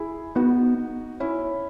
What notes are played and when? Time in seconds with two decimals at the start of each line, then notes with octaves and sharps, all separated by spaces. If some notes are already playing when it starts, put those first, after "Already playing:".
Already playing: E4 G#4
0.35 B3 D#4 F#4
1.20 C#4 E4